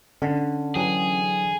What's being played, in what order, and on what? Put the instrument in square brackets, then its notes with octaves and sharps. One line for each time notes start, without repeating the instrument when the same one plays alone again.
[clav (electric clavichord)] D3 [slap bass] C#4
[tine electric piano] E3 F#3 G5 [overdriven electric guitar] G#4